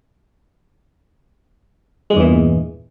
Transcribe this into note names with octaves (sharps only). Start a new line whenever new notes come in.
E2 G2 A#2 E3 G#3